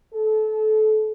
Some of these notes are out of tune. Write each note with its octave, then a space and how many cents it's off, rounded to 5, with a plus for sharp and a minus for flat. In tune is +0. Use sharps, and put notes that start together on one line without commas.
A4 -25